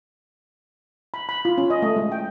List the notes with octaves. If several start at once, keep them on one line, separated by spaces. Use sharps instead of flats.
B5
B5
F4
C#4
D#5
A3
G#3
G5